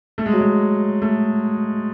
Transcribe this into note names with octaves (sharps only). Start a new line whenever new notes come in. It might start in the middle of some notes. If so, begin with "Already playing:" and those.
A3
G#3
F#3
G#3
A3